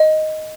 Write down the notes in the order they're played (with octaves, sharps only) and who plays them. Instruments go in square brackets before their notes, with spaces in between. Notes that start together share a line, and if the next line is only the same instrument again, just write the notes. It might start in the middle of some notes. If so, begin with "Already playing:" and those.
Already playing: [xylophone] D#5